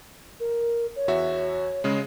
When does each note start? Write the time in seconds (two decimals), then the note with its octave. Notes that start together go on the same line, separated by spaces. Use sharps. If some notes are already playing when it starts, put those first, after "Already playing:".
0.40 A#4
0.96 C#5
1.08 E2 F#4 E5
1.84 C#3 G#3